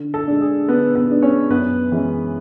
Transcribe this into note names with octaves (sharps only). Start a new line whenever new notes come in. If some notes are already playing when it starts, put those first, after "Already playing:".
Already playing: D3
A4
G#3 D4
G#4
D3 B3 B4
B3 B4
G#3 D4
C#4 C#5
F#2 B3 B4
E3 G#3 C#4